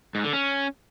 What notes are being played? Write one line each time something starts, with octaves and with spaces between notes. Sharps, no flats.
G#2
D3
C#4